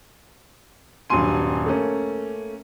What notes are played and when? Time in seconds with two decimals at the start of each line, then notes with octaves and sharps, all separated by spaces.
1.10 D#1 G2 F#3 G#5 C6 D#7
1.66 A3 A#3 C#4